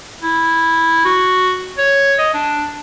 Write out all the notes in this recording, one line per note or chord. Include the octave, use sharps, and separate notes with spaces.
E4
F#4
C#5
D#5
D4